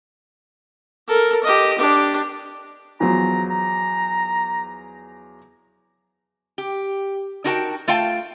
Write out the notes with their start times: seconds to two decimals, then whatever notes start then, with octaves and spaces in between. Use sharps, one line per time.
1.08 A4 A#4
1.44 G4 D#5
1.78 D4 G4
3.00 E2 F3 F#3 A#5
3.51 A#5
6.58 G4
7.44 D4 D#4 F#4 A#4 G5 A5
7.88 A3 F4 F5 G5 A5